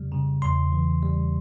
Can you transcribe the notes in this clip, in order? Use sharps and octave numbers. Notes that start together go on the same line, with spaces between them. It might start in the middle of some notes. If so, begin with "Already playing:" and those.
Already playing: F2 C#3 G3
C#3
E2 C6
E3
G3